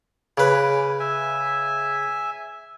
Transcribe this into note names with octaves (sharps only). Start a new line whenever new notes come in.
C#3 B4 G#5 D6
E5 G#5